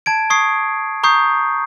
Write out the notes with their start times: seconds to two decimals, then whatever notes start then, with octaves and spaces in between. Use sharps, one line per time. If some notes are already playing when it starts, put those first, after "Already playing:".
0.06 A5 G#6 D7
0.30 C#6 D#6 G#6 C7
1.03 A#5 C#6 D#6 G6 C7